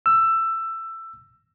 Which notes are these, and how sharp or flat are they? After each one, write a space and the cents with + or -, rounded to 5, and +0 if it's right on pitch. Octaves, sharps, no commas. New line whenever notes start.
E6 +15